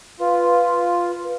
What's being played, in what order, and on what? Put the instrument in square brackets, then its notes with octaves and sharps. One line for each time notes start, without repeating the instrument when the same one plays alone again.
[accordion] F4 [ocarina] B4